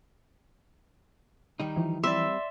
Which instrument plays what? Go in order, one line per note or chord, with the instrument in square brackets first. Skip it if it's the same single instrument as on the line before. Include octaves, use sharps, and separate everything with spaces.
[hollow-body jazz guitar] D#3 G3 D#4
[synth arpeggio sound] E3 F3 E4
[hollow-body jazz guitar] G3 C4 [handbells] D5 C6 [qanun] E5